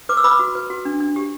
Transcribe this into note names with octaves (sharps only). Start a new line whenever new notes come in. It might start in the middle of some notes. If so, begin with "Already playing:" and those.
B4 D6
E6
B4 B5 D6
F#4
B4
F#4
D4
D4
G4